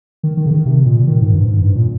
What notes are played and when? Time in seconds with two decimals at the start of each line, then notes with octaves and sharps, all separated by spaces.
0.23 D#3
0.37 D#3
0.46 C#3
0.51 D#3
0.66 C3
0.86 A#2
1.07 D#3
1.21 G#2
1.34 G2
1.48 G#2
1.62 G2
1.76 A#2